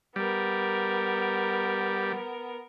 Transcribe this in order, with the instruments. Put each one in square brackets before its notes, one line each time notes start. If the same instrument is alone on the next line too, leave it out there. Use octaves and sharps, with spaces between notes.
[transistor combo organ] G3 [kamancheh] B3 A#4